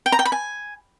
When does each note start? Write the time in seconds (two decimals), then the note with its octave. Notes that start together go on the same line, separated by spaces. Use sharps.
0.06 G5
0.12 A#5
0.19 G5
0.25 B5
0.32 G#5